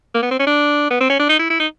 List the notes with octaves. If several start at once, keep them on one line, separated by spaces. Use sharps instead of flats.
A#3
B3
C4
C#4
D4
B3
C4
C#4
D4
D#4
E4
E4
D#4